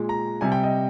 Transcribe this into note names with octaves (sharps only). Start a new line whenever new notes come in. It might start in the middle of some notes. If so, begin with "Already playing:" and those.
Already playing: A#2 G#3
A#5
C3 G3 G#5
G5
D#5